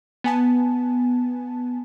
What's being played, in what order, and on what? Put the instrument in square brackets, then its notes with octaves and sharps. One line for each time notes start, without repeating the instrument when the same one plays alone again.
[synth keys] B3 G#5 A5